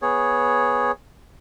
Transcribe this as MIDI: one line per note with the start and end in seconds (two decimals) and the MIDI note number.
0.02 0.91 59
0.02 0.91 68
0.02 0.91 73